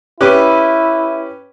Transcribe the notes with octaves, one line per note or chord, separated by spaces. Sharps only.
C#4 E4 G4 B4